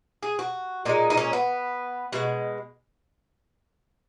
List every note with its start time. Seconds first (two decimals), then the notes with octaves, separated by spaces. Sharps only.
0.23 G#4
0.39 F#4
0.85 A#2 G#3 D#4
1.10 D#4
1.17 C#4
1.33 B3
2.13 B2 G#3 F#4